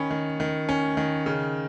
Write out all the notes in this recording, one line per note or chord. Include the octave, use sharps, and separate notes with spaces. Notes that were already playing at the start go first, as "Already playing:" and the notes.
Already playing: D#3 C#4 B5
D#3
D#3
C#4
D#3
C#3